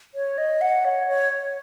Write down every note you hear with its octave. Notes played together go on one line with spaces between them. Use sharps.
C#5
D#5
F#5
C#5
C#5